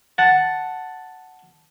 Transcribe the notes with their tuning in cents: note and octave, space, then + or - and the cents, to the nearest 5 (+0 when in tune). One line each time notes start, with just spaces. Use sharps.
F#5 +0 A5 +0